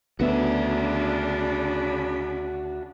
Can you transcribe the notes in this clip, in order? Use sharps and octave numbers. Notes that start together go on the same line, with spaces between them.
D2 C#3 B3 D4 F#4 E5